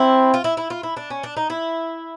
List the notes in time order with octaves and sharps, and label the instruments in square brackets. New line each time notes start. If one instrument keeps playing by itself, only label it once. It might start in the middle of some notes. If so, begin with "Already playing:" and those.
Already playing: [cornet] C4 [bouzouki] E4
[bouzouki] F4
E4
E4
F4
E4
D4
C#4
D4
D#4
E4